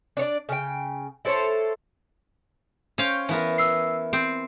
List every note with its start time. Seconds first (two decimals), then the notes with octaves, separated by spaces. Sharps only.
0.17 D4 C#5 D5
0.49 C#3 G5
1.25 E4 A4 C5 C#5
2.98 C#4 C5 C#5 F5 G5
3.29 E3 B3 A#4
3.58 E6 C7
4.13 C4 D7